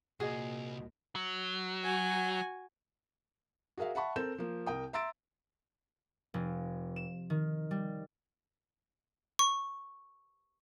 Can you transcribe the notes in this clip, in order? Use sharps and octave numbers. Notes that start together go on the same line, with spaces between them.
C2 A#2 F#4 G#4 D#5
F#3
F#4 G#5
F#4 G#4 A#4 E5 F5
E5 F#5 A5 B5 C#6
C4 A4 A#4 G6 E7
F3 A#3
C2 A#4 G5 D#6
E5 A#5 C6 E6 A6 D7
F1
E7
D#3
G3
C#6